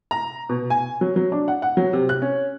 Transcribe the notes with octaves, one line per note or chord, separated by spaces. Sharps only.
A#5
B2
G#5
F#3
F#3
D4
F#5
F#5
F#3
C3
F#6
C#4